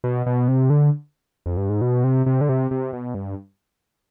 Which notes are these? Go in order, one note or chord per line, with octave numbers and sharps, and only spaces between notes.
B2
B2
C3
D3
F2
G2
G#2
B2
C3
C3
D3
C3
C3
B2
G2